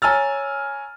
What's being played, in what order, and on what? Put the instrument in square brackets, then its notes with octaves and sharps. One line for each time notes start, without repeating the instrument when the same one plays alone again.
[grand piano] C#5 G#5 A#5 E6 F6 A6